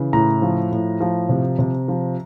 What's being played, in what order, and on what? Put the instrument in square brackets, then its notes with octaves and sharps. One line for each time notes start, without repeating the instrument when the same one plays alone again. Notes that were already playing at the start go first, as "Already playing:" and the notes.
Already playing: [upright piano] C#3 E3
A2 A#5
F3
A2
F3
C3
C3
F3